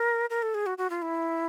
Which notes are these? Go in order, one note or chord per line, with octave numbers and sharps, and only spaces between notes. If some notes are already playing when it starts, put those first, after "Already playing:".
Already playing: A#4
A#4
A4
G#4
F#4
F#4
F4
E4